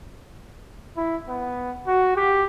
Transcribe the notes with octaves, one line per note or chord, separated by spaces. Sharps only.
E4
B3
F#4
G4